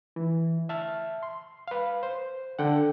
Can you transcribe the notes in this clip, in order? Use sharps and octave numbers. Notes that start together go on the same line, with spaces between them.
E3
E5 A5 F6
C6
B4 F5
C5
D3 F#5 G5